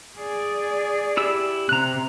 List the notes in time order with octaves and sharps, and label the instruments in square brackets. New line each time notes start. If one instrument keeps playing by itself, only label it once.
[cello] G#4 D5
[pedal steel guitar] E4 G4 E6
[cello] C3 [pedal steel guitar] A#5 F#6